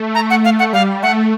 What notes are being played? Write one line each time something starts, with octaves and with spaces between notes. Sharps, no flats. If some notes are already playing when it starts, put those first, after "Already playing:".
Already playing: A3
A#5
F#5
F5
F#5
G3 F5
A3 F#5